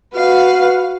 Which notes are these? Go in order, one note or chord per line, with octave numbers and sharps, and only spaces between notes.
F#4 B4 F5